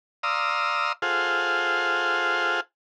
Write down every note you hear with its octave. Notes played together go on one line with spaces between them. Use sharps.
D5 F5 A#5 C6 D#6 E6
F4 G#4 A4 C5 F5 F#5